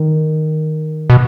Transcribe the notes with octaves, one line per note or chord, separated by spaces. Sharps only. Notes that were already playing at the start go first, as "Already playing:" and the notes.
Already playing: D#3
B2